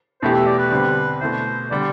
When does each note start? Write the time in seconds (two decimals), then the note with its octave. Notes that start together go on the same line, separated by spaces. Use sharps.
0.21 E2 B2 A3 E4 G4 C5
0.34 E5
0.46 D5
0.59 B4
0.71 D3 G3 C4 G4
1.21 B2 A3 E4 C5
1.71 D3 G3 D5